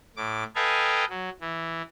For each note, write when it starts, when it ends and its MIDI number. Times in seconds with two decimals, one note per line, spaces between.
0.17 0.44 45
0.17 0.44 86
0.55 1.05 69
0.55 1.05 71
0.55 1.05 75
0.55 1.05 77
0.55 1.05 79
0.55 1.05 80
1.09 1.29 54
1.41 1.82 52